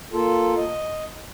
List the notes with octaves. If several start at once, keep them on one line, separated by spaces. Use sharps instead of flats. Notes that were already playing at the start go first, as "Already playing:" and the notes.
A#3 F4 A4
D#5